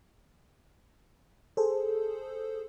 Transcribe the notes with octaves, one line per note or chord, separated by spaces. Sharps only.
G#4 A4 C5